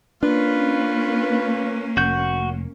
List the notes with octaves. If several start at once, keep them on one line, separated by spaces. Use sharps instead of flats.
A#3 C#4 D4 F4 B4
F1 F#4 G6